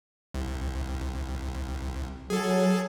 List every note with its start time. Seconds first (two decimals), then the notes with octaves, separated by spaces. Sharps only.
0.34 C2
2.30 F#3 G#4 A4